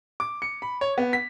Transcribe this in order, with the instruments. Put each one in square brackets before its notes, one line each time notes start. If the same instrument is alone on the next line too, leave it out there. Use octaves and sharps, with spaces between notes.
[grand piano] D6
C#7
B5
C#5
B3
B6